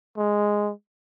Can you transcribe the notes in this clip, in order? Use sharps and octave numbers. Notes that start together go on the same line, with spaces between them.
G#3